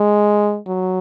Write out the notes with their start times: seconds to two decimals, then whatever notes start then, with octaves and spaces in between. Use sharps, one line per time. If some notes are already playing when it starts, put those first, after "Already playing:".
Already playing: G#3
0.67 F#3